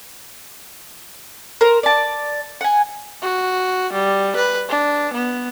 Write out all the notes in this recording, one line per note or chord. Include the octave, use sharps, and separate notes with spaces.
A#4 C5
D5 A5
F#5 G#5
F#4
G3
B4
D4
B3